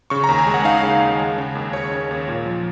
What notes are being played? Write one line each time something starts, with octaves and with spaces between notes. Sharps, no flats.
C#3 C#6
A#5
D#2
G#5
G#3
F#5
D#4 F5
C#3
D#2
G#3
C#3
D#2
D#2 C#5
C#4
D#2
A#2
F3